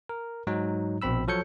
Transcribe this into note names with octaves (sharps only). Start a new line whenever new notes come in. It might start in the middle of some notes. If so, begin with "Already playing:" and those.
A#4
G#2 F#3 D#4
A#1 B2 C4 B5 E6
F3 F#3 A4 C#5 G6 C#7